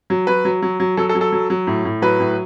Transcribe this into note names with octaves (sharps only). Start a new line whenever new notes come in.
F#3
F#3 B4
F#3
F#3
F#3
F#3 A4
A4
F#3
A4
F#3
F#3
A2
A2
F#3 B4
A2